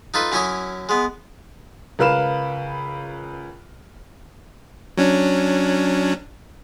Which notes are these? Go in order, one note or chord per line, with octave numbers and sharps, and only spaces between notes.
D#4 F4 A4 B4
F#2 C#4 E4 C#5 G#5 D#6
G#3 B3
C#2 A#4 B4 F5 B5 E7
F#3 C#4 D4